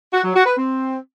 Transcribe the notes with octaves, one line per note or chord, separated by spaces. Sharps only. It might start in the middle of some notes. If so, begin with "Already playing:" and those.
F#4
F#3
F#4
B4
C4